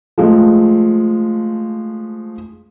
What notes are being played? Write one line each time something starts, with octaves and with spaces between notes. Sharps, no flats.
F3 G#3 A3